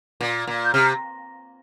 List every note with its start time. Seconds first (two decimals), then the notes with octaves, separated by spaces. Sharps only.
0.21 A#2
0.47 A#2
0.65 G6
0.74 C3 F6